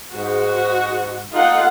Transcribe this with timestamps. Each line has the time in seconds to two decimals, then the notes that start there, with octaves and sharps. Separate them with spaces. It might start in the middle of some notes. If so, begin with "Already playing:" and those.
0.13 G#2 F#4
1.33 D#4 F4 A4 F#5